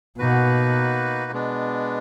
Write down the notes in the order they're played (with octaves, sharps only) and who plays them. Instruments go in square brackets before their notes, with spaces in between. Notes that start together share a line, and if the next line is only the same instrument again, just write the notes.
[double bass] B2 [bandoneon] A#3 D#4 F#4 B4
[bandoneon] B2 G#3 B3 D4